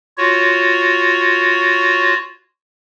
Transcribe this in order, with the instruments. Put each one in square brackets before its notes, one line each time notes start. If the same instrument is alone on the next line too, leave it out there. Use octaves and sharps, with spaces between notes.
[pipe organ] F4 F#4 C#5